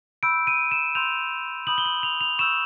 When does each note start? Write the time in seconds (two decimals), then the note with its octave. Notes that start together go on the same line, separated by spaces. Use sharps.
0.23 B5 E6 G6 D7
0.47 D#7
0.71 E7
0.95 C6 E6 G6 F7
1.67 B5 D#6 G6 F#7
1.78 G7
1.86 F#7
2.03 F7
2.21 F7
2.39 C#6 E6 G6 E7